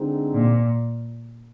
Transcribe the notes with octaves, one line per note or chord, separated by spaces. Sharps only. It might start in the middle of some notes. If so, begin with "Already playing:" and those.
Already playing: D3 G#3 C4 D#4
A#2